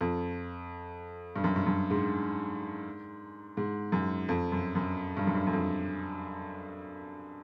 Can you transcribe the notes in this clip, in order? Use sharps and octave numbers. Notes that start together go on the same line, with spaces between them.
F2
G2
F#2
G2
F#2
G#2
G#2
F#2
F2
F#2
F#2
G2
F#2
G2
F#2
F2